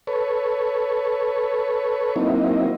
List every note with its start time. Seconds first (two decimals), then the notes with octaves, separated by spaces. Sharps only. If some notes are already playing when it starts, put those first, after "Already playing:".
0.07 A4 B4 C#5
2.16 F#3 A#3 C4 D#4 E4